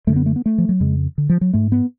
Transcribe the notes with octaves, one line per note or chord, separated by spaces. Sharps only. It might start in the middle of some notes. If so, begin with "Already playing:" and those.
F#2 D3 A3
B3
A3
B3
A3
F3
F#3
F2 C#3 G#3
D3
F3
F#3
G#2 A3
B3